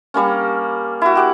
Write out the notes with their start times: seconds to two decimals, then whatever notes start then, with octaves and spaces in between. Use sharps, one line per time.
0.14 G3 A#3 C#4
1.02 E4 F#4
1.15 G4 F#5 D6